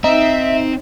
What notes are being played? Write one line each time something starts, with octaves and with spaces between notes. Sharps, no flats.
C4 D#4 E5